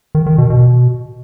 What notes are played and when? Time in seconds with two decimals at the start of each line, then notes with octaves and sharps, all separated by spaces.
0.15 D#3
0.26 D#3
0.38 B2
0.50 B2